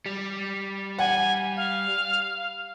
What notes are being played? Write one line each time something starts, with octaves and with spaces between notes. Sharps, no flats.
G3
F#5 G#5
F5